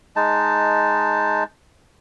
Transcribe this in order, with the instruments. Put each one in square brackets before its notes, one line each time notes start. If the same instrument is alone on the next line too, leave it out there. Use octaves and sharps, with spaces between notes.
[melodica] G#3 D#4 A5